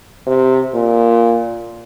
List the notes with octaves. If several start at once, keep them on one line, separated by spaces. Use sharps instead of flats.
C3
A#2